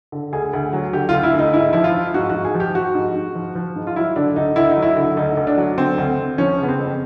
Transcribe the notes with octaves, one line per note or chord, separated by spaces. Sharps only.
D3
D2 G#4
D2
F#3
D3 G4
D2 F4
E4
D2 D#4
G#2 E4
F3 E4
F4
F3
G#2 F#4
G#2 F#4
G#4
F3
G4
F3 F#4
G#2
G#2
F3
F3
G#2
F4
F#3 E4
D3 D4
D2 D#4
D2 E4
D#4
F#3
E4
D3
D2 D#4
D2
D4
F#3
D3 C4
D2
D2
F3 C#4
C#3
B3
C4
F2